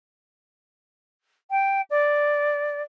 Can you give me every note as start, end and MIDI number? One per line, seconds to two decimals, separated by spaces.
1.50 1.81 79
1.90 2.82 74